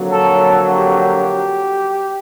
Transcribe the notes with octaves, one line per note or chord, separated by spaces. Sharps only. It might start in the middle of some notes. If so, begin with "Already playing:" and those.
Already playing: F2 D3 F#3 A#3
A4
G4